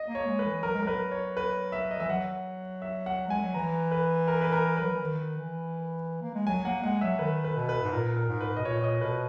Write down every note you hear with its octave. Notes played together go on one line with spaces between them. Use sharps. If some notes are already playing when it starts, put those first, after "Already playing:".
Already playing: D#5
A#3
C#5
G#3
B4
E3
F#3 A#4
G#3
F#3 A#4 B4
C#5
B4
E5
D#5
E3 E5
F#3 F#5
E5
F#5
G#3 G#5
F#3
E3 A#5
B4
A#4
B4
A#4
F#3 B4
E3
D#3
E3
A#3
G#3
F#3 G#5
A#3 F#5
G#3 F#5
F#3 E5
D#3 B4
B4
B2
B4
G#2
A#2 A#4
A#4
G#2
B4
B2 D#5
A#2 C#5
C#5
D#5
B2 B4